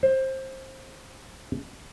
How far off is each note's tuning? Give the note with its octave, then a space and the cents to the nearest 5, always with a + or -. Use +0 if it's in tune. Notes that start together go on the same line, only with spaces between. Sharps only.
C5 +20